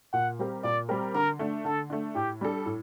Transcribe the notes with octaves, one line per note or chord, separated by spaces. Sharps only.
A#2 F#5
G3 C4 G4 A#4
A#2 D5
G3 C4 G4 A#4
D3 A#4
A3 D4
D3 A4
A3 D4
A2 G4
G3 D4 A4
A2